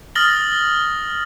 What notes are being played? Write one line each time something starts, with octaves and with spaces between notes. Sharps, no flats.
D#6 F6 A6 A#6 F#7 G7